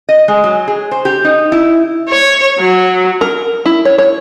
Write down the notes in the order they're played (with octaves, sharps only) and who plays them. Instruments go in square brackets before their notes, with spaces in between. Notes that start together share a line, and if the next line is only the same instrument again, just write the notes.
[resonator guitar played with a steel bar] D#5
G#3
F#3
G#4
C5
G4
D#4
E4
[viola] C#5
F#3
[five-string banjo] A#4
E4
C#5
C#5